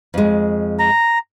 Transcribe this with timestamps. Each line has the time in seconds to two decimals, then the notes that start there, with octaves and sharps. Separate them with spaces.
0.14 F2 G#3
0.79 A#5